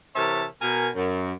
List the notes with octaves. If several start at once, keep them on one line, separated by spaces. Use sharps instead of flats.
C3 E3 A#4 C#5 E5 A5
B2 A#4 G#5
F#2